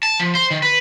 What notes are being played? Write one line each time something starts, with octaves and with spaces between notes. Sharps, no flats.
A5
F3
C5
D#3
B4